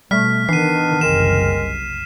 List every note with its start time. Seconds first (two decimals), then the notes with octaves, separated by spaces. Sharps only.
0.11 B2 G3 A3 F6 B6
0.49 D#3 E3 B3 D4 C7 D#7
1.01 F#1 C2 G#3 C4 A#4 E7